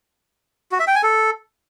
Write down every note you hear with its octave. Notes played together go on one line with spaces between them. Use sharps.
F#4
E5
G5
G#5
A4